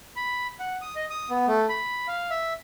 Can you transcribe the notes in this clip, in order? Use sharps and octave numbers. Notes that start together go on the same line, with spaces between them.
B5
F#5
D#6
D#5
D#6
B3
A3
B5
F5
E5